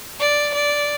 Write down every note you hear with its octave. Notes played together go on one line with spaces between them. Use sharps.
D5
D5